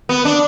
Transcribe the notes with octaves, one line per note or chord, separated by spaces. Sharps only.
B3
D4